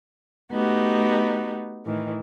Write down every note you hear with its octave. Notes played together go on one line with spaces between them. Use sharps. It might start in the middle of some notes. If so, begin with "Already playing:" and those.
A3 B3 D#4 F#4 G4
A2 D#3 E3